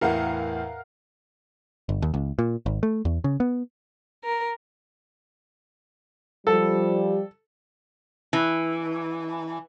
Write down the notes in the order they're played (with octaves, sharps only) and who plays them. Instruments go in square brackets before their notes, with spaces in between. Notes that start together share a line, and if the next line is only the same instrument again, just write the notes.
[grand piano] E2 A2 [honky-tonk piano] A#4 F5 F#5
[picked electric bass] G1
D#2
C#2
A#2
G#1
A3
E2
C#3
B3
[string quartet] A#4
[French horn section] F3 G3 [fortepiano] A4
[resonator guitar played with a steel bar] E3